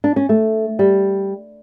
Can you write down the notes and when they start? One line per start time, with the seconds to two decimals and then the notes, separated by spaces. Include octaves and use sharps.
0.04 D4
0.16 C#4
0.29 A3
0.79 G3